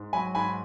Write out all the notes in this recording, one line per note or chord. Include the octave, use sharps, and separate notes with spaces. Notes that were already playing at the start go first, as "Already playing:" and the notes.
Already playing: G#2
F#3 G#5 B5
G#2 G#5 B5